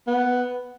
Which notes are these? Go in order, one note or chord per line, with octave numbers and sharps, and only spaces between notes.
B3